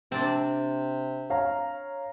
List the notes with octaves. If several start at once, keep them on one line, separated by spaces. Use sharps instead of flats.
C3 C4 D4 D5
C#5 F5 A#5